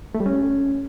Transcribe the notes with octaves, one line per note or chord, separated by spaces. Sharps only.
A3
G3
C#4